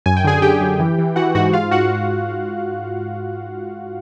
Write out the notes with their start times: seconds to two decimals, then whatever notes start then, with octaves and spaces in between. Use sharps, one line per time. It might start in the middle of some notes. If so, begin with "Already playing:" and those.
0.06 F#2 G#5
0.17 G5
0.24 D3 G#4 G#5
0.42 D3 G4 G5
0.61 F#2
0.80 E3
0.98 E3
1.16 E3 F#4 F#5
1.35 G#2 F#4 F#5
1.53 G#2 F4 F5
1.71 G#2 F#4 F#5